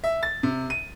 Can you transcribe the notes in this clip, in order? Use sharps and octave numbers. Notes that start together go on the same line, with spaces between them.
E5
A6
C3
D#7